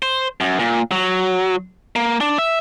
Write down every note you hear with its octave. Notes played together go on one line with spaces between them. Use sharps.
C5
F#2
A#2
F#3
A#3
D4
E5